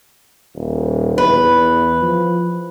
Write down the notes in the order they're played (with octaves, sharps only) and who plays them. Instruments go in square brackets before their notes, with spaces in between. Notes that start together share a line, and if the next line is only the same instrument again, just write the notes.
[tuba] D#1
[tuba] E2 [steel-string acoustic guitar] B4
[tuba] F3